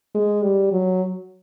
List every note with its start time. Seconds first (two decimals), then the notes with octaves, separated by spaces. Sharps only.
0.15 G#3
0.43 G3
0.72 F#3